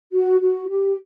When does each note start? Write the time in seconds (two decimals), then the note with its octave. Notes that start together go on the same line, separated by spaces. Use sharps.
0.13 F#4
0.40 F#4
0.69 G4